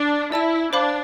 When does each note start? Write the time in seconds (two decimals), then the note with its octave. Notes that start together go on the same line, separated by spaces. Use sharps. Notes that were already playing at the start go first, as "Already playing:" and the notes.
Already playing: D4
0.32 E4 D5 A5 E6
0.73 D4 C5 F5 B5 D6